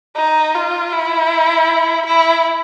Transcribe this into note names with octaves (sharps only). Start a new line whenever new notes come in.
D#4
F4
E4
E4